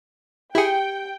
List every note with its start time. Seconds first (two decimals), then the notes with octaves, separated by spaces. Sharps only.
0.55 E4 G4 G#4 G5 C#7